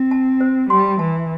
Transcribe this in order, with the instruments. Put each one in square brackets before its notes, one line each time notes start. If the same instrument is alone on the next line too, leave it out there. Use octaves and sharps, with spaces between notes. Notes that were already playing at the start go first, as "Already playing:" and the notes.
Already playing: [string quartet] C4
[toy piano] A5
C5
[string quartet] G3 [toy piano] C6
[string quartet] E3 [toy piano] A5